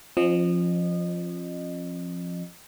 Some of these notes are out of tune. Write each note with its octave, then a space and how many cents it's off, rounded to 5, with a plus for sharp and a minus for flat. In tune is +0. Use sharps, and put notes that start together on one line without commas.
F3 +0 C4 +40 D#5 -25